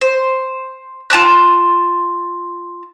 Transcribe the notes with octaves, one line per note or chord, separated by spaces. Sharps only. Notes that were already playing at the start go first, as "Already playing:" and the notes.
C5
F4 A5 D6 F#6